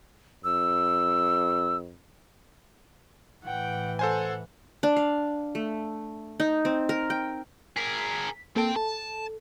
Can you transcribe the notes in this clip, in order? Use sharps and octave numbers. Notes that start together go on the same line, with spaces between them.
F2 E6
A2 E3 F#5 G5
A4 C5 F#5 G#5
D4
F5
A3
D#4
C4
A#4
G5
G#4 A#4 B6
A#3 C4 A4 G5 A5
A4 A5